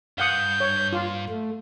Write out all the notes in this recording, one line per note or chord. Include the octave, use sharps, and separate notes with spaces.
G2 F5 F#5 D#6 G6
C#5
F4
A3